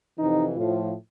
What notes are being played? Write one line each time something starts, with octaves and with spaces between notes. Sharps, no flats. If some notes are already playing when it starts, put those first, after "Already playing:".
F2 C3 E3 D#4
A2 F3 F4